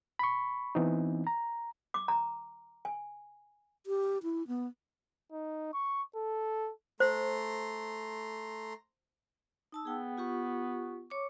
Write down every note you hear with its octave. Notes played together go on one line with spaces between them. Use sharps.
B5 C#6
E3 B3 C4 D#4
A#5
D6
A#5
G#5
G4
E4
B3
D#4
C#6
A4
A3 C5 A#5 C6
D#4 A5 E6
B3 G#4 G5
F4 G4 C#6
C#5 C#6 D6